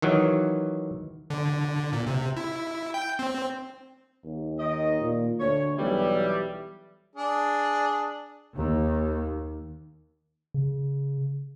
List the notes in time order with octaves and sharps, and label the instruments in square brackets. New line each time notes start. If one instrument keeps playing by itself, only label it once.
[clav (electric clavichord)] D#3 E3 F#3
[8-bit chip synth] D3
A#2
C3
E4
G5
C4
[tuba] D#2
[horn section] D#3 D#5
[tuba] A#2
[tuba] D2 [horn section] C#5
[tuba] B1 [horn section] E3 G3
[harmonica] D4 G#4
[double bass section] D#2
[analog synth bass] C#3